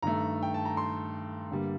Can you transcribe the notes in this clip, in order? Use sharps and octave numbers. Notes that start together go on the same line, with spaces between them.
G2 D#3 A3 A#5
G5
A5
A#5
C6
G2 D3 G3 A#3